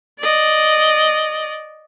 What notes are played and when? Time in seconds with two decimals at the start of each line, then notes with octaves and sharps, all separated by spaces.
0.19 D5 D#5